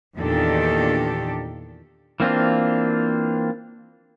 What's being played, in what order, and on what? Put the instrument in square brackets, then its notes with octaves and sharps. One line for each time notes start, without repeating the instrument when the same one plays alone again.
[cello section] E2 A#2 D#3 D4 G4 A4
[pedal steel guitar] E3 A#3 C4 D4 F4